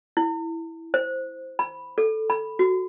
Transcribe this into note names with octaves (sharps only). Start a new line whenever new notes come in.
E4
C5
B5
A4
B5
F#4